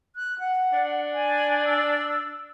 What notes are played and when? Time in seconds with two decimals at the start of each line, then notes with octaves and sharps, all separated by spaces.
0.16 F#6
0.39 F#5
0.73 D4
1.13 G#5
1.66 E6